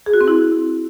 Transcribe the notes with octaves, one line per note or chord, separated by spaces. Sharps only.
G#4
F#4
C4
E4